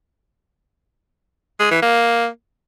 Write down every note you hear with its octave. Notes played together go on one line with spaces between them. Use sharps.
G#3
E3
A#3